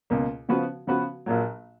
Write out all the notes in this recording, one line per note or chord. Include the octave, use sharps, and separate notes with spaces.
C#2 B2 A#3
C#3 F3 B3 F#4 B4
C#3 F3 B3 F#4 B4
A#1 A#2 F#3